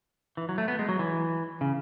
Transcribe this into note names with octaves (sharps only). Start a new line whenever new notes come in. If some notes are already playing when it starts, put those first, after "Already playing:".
E3
F#3
A3
B3
G#3
F#3
E3
C#3